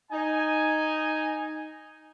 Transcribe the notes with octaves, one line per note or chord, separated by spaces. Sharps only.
D#4 G#5